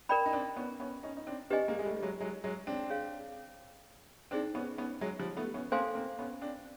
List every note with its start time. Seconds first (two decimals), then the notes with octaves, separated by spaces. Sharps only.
0.09 A#4 D5 G5 B5
0.26 D#4
0.33 C4 D4
0.56 B3 C#4
0.80 B3 C#4
1.03 C#4 D#4
1.17 D#4
1.27 C4 D4
1.50 C4 D4 G4 B4 D#5 G#5
1.68 G#3 A#3
1.79 G#3
1.85 G3 A3
1.96 G3
2.03 F#3 G#3
2.20 F#3 G#3
2.44 F#3 G#3
2.67 C4 D4
2.90 G#4 C#5 F5
4.31 C4 D4 D#4 G#4 C5
4.55 B3 C#4
4.78 B3 C#4
5.01 F#3 G#3
5.19 F3 G3
5.37 A3 B3
5.54 B3 C#4
5.72 A#3 C4 A4 C5 F5 G#5 C6
5.95 A#3 C4
6.19 B3 C#4
6.41 C4 D4